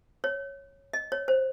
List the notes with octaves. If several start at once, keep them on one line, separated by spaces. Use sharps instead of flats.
C#5
D#5
C#5
C5